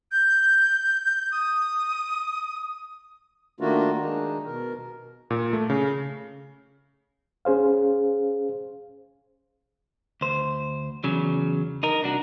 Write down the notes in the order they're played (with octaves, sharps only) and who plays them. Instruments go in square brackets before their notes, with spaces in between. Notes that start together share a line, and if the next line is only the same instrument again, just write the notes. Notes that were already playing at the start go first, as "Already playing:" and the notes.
[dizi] G6
D#6
[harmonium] D#3 A3 A#3 D4 F4 F#4
D#3 G#3 D4 D#4
B2 A#4
[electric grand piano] A#2
A3
C#3
[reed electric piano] C#4 G#4 C5 F5
[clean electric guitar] D2 C5
E2 C#3 F#3
D#4 A#4
C2 D4 F#4